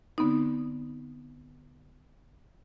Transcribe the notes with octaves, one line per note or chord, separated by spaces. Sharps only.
D3 B3 C4 D#4